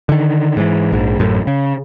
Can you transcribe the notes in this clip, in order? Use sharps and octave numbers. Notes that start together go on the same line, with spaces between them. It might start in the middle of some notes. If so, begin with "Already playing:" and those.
D3 D#3
G#2 E3
A#1 G#2
A1 F#2 A2
C#3